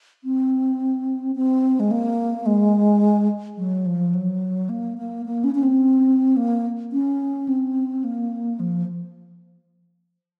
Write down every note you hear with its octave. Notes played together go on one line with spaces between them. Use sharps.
C4
C4
G#3
A#3
G#3
F#3
F3
F#3
A#3
A#3
A#3
C#4
C#4
C4
A#3
C#4
C4
A#3
F3